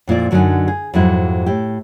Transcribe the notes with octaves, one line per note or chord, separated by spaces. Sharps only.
F2 A#2 E4 D5
F#2 D3 F#3 D4 D#4 G#5
G#4
F2 G#2 F#3 E4
A2 E4 G4